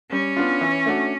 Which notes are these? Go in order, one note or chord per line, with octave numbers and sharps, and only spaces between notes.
G3 C#4
B3 D4 F4
E3
A3 D4 F#4